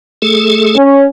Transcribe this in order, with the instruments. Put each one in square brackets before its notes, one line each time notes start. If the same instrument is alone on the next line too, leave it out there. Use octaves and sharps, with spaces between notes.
[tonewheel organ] A3 G#4 A4
[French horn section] C#4